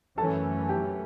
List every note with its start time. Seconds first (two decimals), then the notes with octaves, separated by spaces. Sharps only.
0.17 F#2 E3 A3 C#4 A4 A5
0.69 G4 G5